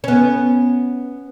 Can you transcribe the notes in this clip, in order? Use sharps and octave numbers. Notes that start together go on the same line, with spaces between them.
B3 C#4